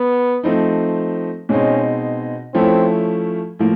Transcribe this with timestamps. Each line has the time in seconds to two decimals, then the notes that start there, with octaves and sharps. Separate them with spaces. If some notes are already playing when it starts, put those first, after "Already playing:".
Already playing: B3
0.44 F3 A3 C4 D#4
1.49 B2 G#3 C4 C#4 D#4
2.54 F3 A3 C4 C#4 E4
3.59 A2 F3 A#3